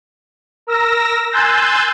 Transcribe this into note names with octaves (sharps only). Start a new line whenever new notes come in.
A#4 E6 A#6
G#5 C6 E6 F#6 G6 A6